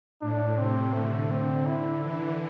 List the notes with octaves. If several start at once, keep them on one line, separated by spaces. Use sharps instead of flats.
A2 D4
C3 C4
D3 A3
C4
E4
E3 E4